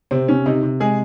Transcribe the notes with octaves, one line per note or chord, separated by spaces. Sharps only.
C3 C4
C3 C#4
C3 D#4
C3
G#3 G#4